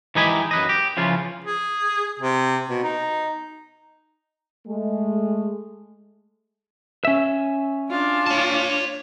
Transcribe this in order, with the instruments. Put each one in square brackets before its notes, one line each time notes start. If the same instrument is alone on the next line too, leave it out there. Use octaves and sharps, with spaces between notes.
[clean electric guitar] E3 G#3 D#4 G4 G#5 B5
F#2 B4 D#5
G4
C#3 E3 F3 F4
[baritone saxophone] G#4
C3
B2
D#4
[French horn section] G#3 A3
[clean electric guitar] C#4 E5
[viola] D4 F4
[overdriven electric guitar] C#5 A5